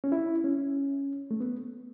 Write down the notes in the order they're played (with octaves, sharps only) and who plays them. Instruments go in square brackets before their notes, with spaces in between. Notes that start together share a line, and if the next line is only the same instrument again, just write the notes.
[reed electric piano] C#4
E4
C#4
A3
B3